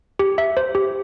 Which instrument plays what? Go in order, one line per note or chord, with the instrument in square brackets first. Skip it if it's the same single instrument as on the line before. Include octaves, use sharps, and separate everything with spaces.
[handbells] G4
E5
C5
G4